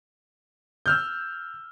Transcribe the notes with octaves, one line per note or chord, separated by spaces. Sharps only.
E6 F6 G6